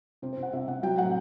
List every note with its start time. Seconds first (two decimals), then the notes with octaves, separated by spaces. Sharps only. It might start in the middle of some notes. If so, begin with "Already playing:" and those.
0.22 C3 C5
0.33 C5
0.37 C3
0.43 F#5
0.53 C3 E5
0.68 C3 F#5
0.83 F#3 G5
0.98 A2 F#5